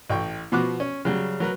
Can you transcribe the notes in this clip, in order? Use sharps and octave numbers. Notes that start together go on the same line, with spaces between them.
A1 G5 C#6
B2 F3 B3 F#4 D6 F#6
C#4
C#3 F#3 G3
F#3 A#4 B4